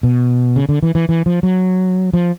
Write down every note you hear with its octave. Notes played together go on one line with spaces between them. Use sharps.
B2
C#3
D3
E3
E3
E3
F3
F#3
F3